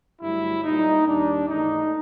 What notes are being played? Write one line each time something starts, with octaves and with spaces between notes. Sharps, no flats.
G2 D3 F#3 A3 E4
A#2 G3 D#4
D#2 D#3 G3 D4
G#2 E3 A3 D#4